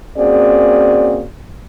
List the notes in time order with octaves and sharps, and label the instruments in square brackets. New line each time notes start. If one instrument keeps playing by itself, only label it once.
[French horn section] A#3 C4 C#4 F#4 G#4 D5